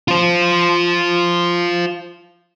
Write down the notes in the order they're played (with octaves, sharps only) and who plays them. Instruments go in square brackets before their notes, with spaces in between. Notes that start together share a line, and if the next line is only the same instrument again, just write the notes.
[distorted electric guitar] F4 C5